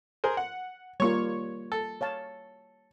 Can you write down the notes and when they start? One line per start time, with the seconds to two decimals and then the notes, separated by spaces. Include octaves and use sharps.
0.24 G#4 A#4 C5
0.37 F#5
1.00 G3 A#3 F4 C#5 C#6
1.72 A4
2.01 C#5 F5 A5